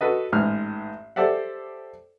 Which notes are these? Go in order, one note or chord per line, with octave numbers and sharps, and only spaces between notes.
F#4 A4 B4 D#5
A1 G#2 F6
G4 A4 C5 D5 E5 F#5